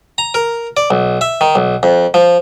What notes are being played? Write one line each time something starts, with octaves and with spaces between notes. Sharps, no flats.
A#5
A#4
D5
B1
E5
D#3
B1
F2
F3